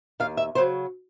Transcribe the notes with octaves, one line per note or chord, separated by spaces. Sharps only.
D#2 F5
E5
C#3 F#3 C5